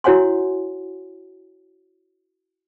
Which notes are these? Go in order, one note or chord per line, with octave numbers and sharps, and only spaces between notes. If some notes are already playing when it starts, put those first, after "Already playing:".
E4 F#4 C#5 F#5 G#5 C6